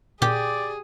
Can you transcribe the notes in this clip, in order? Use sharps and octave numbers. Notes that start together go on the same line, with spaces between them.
A#2 G4 G#4 D5